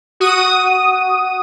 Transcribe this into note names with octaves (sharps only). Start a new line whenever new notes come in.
F#4 D#6